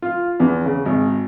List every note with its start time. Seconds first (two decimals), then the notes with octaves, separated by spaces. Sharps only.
0.02 F4
0.40 E2
0.65 C#3
0.85 G#1